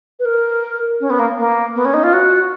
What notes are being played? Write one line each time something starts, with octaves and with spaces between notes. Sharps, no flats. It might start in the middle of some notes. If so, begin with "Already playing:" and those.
B4
A#4
C#4
B3
A#3
A#3
B3
C#4
D#4
F4
F#4